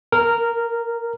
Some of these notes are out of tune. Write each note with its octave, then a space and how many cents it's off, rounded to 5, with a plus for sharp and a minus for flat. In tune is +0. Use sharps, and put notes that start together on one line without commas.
A#4 -10